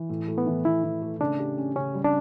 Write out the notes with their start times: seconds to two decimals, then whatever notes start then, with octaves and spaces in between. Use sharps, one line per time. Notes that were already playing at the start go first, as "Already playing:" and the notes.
Already playing: E3
0.09 A2
0.28 A3
0.38 B3
0.47 E3
0.65 E3 E4
0.83 E3
1.02 A3
1.20 C#3 D4
1.39 G4
1.58 C#4
1.76 C#3 C#4
1.94 G3
2.04 D4